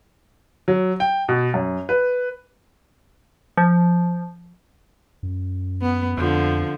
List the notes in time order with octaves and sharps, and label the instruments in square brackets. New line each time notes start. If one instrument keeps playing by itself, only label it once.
[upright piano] F#3
G5
B2
F#2
B4
[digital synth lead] F3
[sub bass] F#2
[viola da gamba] B3
[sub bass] F2 [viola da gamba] D3 [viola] F3